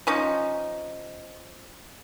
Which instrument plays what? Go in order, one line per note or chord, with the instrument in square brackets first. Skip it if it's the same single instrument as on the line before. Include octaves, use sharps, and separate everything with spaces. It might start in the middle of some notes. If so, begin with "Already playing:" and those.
[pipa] F3 C#4 D#4